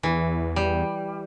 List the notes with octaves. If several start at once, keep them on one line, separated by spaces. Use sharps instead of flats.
E2 E3
G3